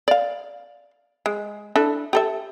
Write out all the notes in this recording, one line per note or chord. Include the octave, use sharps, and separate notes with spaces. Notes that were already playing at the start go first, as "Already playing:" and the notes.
D5 F5
G#3
D4 E4 A4
G4 A4 E5